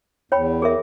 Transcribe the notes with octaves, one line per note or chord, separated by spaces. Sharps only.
E2 C#5 G5 B5
G#4 A#4 E5